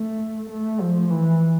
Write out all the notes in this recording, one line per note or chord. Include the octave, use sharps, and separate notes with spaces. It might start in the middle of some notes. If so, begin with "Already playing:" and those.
Already playing: A3
A3
F3
E3